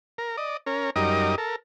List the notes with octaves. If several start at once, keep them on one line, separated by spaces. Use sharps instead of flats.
A#4
D5 D#5
C#4 A#4
F#2 G3 D#4 A#4 D#5 D6
A4 A#4